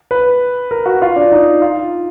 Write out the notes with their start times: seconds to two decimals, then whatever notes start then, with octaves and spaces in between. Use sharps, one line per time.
0.11 B4
0.71 A#4
0.86 F#4
1.02 F4
1.16 D4
1.32 D#4
1.62 F4